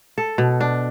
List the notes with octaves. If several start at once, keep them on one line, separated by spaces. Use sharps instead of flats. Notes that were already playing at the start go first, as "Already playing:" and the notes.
A4
B2
D4